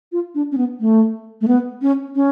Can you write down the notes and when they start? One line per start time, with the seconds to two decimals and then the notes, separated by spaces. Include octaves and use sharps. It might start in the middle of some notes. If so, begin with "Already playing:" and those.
0.12 F4
0.35 D4
0.52 C#4
0.57 B3
0.80 A3
1.41 A3
1.48 B3
1.82 C#4
2.15 C#4